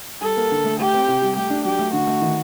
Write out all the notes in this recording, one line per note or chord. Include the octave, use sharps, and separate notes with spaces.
G3 A4
A#3
D3
A3
A3 G4
C4
C3
G3
A3 G4
D4
F#3 G4
A3
D3 F#4
A3
D#3